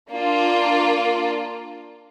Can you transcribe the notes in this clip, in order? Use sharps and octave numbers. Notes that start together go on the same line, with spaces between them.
A#3 D4 F4